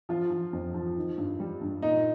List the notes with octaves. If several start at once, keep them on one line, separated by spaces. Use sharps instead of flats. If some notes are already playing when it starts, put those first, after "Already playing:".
F3 F4
F3
F2
F3
D#3
G2
G3
G2
A#2 D#4